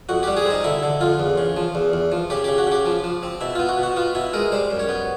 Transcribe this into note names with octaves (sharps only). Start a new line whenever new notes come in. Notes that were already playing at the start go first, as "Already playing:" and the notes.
F2 F#4
G3 G4
G#4
C4 D#4
D3 E4
D3
F2 F4
E2
C#3
F3
E2
E2
F3
C#3 G4
C#3 G4
F#4
C#3 G4
F3
F3
C4
B2 E4
B3 F4
F#4
B2
F#4
B3 F4
B2 E4
G#3 A#4
G3 C5
F#2
C#5
B3